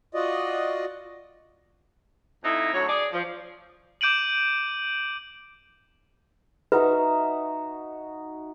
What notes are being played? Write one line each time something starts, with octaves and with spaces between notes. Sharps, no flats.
F4 F#4 D5 D#5
F2 D#4 E4
D2 F#3 C#5
G#4 D5
F3
D6 G6 D7 D#7 F#7
D#4 F#4 B4 E5